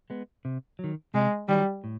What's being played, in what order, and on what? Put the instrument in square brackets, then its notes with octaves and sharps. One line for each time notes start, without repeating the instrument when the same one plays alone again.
[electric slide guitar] G#3 B3
C3
D#3 F#3
[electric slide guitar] C3 [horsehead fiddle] G#3
[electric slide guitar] D#3 F#3 [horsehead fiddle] G3
[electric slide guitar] A2